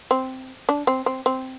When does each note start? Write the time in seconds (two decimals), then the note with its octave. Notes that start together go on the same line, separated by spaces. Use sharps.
0.11 C4
0.69 D4
0.87 C4
1.06 C4
1.26 C4